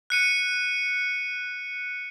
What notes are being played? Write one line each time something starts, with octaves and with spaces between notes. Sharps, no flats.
F#6 C#7 D#7